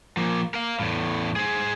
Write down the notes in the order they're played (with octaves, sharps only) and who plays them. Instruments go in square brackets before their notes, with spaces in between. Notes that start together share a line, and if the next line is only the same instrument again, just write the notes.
[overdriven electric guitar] F3 A#3
A#4 F5
E2 A2
G#4 C5